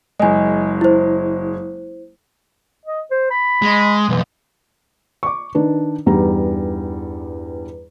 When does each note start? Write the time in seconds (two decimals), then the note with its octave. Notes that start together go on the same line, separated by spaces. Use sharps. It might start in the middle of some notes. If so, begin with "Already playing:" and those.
0.20 F#1 G#3 D#5 G#5
0.81 E4 C5
2.86 D#5
3.11 C5
3.31 B5
3.62 G#3
4.09 B1 F2 E3
5.23 C#6 D6
5.55 D#3 D4 B4
6.06 E2 G2 G3 D#4 A#5